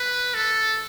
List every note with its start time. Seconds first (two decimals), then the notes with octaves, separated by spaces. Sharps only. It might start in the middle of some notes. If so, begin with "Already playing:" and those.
Already playing: B4
0.34 A4